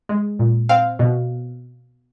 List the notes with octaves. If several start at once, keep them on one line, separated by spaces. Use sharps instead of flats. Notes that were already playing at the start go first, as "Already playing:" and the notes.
G#3
A#2
C4 F5
B2